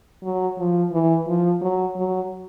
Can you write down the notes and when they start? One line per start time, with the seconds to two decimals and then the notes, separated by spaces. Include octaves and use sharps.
0.23 F#3
0.58 F3
0.92 E3
1.27 F3
1.61 F#3
1.96 F#3